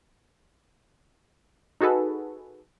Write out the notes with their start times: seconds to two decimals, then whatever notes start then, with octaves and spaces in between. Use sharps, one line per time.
1.81 D#4 F#4 G#4 A4 B4